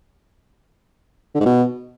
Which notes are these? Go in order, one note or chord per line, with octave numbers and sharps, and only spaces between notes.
D3
G#2
B2